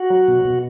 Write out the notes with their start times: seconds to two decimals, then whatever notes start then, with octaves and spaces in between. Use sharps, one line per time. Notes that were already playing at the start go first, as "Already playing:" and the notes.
Already playing: F#4
0.10 F#3
0.28 B2
0.45 B2